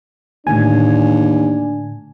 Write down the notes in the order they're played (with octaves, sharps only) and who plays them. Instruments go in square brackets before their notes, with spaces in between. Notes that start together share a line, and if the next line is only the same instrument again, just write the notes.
[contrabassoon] D#2 [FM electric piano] A2 D3 G#5 [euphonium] D4